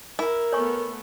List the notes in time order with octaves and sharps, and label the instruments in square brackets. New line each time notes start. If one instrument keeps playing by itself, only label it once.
[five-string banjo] E4 [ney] A#4
[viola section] A3 B3 [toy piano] C#5 G#5 C#6